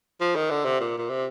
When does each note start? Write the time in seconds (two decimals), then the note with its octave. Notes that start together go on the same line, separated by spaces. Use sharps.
0.21 F3
0.35 D#3
0.50 D3
0.65 C3
0.80 A#2
0.98 A#2
1.10 C3